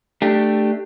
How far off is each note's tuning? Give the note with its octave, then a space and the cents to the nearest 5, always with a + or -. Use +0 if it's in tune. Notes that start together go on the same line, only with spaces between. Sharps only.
A3 +0 D4 +15 G4 +0